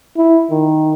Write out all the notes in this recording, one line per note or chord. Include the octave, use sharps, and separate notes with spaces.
E4
D#3